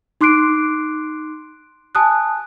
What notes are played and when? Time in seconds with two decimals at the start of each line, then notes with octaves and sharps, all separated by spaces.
0.21 D#4 C6 D6 F#6 C7 D7
1.95 G#5 A5 D#6 F#6